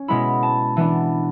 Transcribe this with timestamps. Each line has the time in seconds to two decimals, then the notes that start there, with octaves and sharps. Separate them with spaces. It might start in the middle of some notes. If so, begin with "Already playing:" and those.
Already playing: C#4
0.08 B2 G#3 B3 E4 B5
0.43 A5
0.77 E3 B3 D4